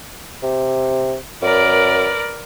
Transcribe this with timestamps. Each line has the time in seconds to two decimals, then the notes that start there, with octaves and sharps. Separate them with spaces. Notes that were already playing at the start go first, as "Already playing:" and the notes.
0.43 C3
1.42 F#2 A#4 B4 D5